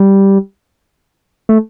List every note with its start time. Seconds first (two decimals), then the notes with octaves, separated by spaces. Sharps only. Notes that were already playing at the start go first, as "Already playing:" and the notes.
Already playing: G3
1.49 A3